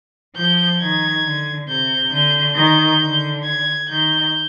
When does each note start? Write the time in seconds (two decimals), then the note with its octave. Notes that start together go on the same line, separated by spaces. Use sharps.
0.36 F3 G6
0.80 D#3 G#6
1.24 D3
1.68 C3 G6
2.12 D3 G6
2.56 D#3 G6
3.01 D3
3.44 G#6
3.89 D#3 G6